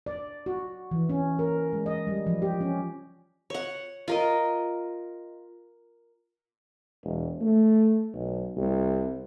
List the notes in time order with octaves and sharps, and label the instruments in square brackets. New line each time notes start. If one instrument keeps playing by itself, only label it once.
[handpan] D5
F#4
E3
C#4
A#4
G#3
D#5
G3
F3
G4
C#4
[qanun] C#5 F#5
F4 A#4 D#5
[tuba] E1
A3
B1
C2